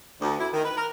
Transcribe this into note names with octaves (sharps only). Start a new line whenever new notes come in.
D2
E4
D#3
B4
A#4